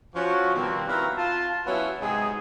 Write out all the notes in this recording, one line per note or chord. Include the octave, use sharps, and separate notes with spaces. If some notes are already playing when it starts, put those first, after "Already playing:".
F3 C#4 F#4
B2 D#3 G3 A#3 C4
C4 E4 F#4 B4 F5 A#5
F4 A5
F#3 B3 C#4 E4
G#2 C3 D#4 G#4